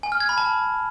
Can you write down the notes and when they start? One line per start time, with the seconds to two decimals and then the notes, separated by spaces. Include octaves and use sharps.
0.03 G#5
0.12 F6
0.20 G#6
0.29 B5
0.38 A5